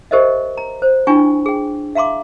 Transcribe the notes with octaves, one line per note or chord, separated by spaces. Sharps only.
G4 A#4 C5 D#5 E5
A#5
C5
D4 E4 F4 G5 G#5 C#6
G#4 G5
E5 F5 A#5 C6 D6